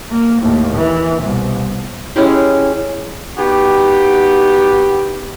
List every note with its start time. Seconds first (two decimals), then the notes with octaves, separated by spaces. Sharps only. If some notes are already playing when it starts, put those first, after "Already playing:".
0.12 A#3
0.42 D#2 A2
0.76 E3
1.22 C2 B2
2.16 G#3 C#4 E4 G4
3.37 B3 D#4 F#4 G4